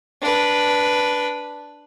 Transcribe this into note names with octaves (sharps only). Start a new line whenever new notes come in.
D4 B4